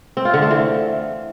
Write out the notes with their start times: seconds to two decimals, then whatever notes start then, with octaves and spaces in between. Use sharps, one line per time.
0.17 C4
0.25 F4
0.34 D3
0.42 A3
0.50 E3